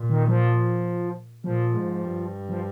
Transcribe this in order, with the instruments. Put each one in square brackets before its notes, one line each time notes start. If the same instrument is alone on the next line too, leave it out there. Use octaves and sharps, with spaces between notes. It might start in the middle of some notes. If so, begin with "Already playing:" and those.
Already playing: [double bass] A#2
[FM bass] D#3
F3
[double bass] A#2 [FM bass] F3
[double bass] G#2
G2
[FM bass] F3